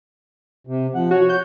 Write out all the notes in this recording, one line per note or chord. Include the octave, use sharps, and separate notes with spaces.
C3
F3 F#5
F#4 C#5
G6